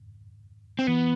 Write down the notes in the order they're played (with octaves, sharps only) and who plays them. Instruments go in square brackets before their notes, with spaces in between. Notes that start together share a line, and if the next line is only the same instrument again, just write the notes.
[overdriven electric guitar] C4
[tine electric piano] E3 [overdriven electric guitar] B3